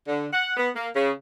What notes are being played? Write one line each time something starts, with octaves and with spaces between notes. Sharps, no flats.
D3
F#5
B3
A#3
C#3